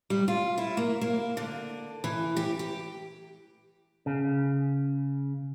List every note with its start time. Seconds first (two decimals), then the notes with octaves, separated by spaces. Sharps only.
0.10 G3
0.28 F4
0.58 E4
0.77 A#3
1.01 A#3
1.37 D3
2.04 E3
2.36 G4
2.59 G4
4.06 C#3